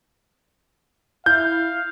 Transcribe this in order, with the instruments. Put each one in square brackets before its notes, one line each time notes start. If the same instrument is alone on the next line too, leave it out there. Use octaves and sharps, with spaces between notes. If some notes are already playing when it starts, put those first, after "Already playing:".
[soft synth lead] E4 [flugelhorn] F5 [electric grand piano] G6